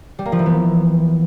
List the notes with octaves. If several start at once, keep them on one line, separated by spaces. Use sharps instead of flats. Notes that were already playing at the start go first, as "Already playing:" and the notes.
G3
A#3
F3
E3
B3